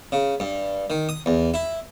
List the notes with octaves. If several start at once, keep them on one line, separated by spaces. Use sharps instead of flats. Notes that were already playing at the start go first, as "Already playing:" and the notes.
C#3
G2
D#3
D#6
E2
E4